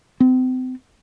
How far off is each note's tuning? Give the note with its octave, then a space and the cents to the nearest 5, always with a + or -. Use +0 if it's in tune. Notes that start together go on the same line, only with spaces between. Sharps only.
C4 -35